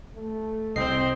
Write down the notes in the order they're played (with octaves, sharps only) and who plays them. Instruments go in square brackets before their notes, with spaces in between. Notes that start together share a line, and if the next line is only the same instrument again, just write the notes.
[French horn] A3
[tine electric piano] C2 C7 [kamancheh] C4 C5 [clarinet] D#5